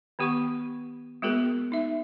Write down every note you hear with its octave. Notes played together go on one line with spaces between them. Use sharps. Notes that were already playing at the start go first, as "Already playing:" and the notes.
D#3 B3 G4 F#5 C#6
G#3 A#3 B3 F#4 G#4 A#4
D#4 E5